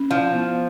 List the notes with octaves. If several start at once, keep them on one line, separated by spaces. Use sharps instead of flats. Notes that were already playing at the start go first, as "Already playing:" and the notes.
Already playing: C#4
F3 E4
B3